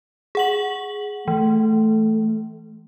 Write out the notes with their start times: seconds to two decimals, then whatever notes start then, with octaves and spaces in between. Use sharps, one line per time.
0.35 G#4 F#5 F#7
1.28 E3 A3